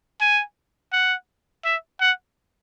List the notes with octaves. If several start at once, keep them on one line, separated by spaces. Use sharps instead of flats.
G#5
F#5
E5
F#5